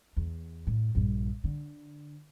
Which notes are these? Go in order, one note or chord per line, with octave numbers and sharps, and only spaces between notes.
E2
A2
A#1 G2
D3